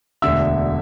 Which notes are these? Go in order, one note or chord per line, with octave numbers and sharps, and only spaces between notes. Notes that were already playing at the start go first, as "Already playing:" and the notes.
E1 D2 D3 E5 E6